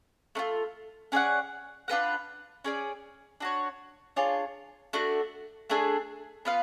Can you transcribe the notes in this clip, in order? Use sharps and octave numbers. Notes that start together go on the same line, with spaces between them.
A3 D4 F4
C#4 G#4 D5 F#5
D4 F4 B4 F#5
C#4 G#4 D5
D4 F#4 C#5
D4 F4 G#4 C#5
A3 D4 F#4
A3 D4 G#4
B3 F4 B4 F5